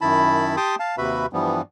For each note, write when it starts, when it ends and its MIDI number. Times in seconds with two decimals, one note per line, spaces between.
0.01 0.56 42
0.01 0.56 51
0.01 0.56 64
0.01 0.56 81
0.01 0.56 83
0.57 0.75 67
0.57 0.75 79
0.57 0.75 81
0.57 0.75 84
0.57 0.75 86
0.57 0.75 87
0.80 0.96 77
0.80 0.96 81
0.98 1.26 39
0.98 1.26 48
0.98 1.26 66
0.98 1.26 71
0.98 1.26 76
0.98 1.26 83
1.33 1.61 43
1.33 1.61 52
1.33 1.61 53
1.33 1.61 55
1.33 1.61 59